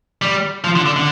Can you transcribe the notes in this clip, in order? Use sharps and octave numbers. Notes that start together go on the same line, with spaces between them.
G3
F3
D3
D3
D3